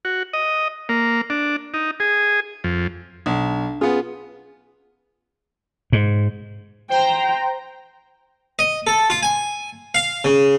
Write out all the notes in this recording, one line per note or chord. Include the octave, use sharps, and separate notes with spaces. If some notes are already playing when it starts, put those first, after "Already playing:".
F#4
D#5
A#3
D4
D#4
G#4
F2
B1 D4
B3 C#4 F4 G#4
G#2
C5 G5 A#5
D#5
A4
F4
G#5
F5
C#3